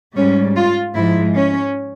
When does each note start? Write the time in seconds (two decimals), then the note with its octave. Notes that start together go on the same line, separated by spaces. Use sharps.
0.16 G#2 G3 C#4
0.55 F4
0.95 G#2 F3 G#3 E4
1.35 C#4